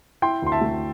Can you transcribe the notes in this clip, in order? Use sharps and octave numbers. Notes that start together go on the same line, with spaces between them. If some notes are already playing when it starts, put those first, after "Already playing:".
E4 G5 C6
D2 C6
E5 A5
A3